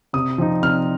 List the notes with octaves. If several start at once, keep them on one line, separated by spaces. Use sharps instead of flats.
C3 D#6
F3 C4 D#4
C3 F6